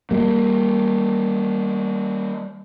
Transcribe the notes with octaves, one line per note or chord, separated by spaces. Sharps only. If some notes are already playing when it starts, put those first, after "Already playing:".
G3 A#3